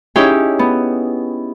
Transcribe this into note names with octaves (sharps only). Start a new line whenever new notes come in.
C#4 D#4 E4 G4 G#4 G5
B3